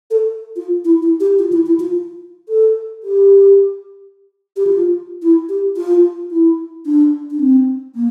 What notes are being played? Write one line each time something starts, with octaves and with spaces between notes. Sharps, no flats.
A4
F4
E4
E4
G4
F4
E4
E4
F4
A4
G4
G4
F4
E4
G4
F4
E4
D4
D4
C4
A#3